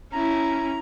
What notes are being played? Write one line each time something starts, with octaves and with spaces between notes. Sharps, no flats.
C#4 E4 A#5